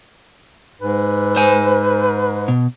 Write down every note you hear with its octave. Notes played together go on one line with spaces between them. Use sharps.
G#2 B4
C5 G#5
B2